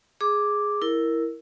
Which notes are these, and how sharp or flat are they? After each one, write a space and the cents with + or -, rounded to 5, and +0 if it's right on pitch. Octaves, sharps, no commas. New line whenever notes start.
G#4 +0 D6 +0
E4 +0 A#4 +0